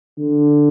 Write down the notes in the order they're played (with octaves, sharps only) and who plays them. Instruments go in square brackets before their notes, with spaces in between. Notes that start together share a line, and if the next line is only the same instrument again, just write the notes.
[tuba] D3